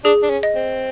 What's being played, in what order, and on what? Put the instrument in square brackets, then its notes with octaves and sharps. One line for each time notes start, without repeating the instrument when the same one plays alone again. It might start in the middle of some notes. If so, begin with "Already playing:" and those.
[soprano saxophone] D4 [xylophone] G#4
[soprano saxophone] D4
C#4
[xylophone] D#5
[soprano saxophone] C4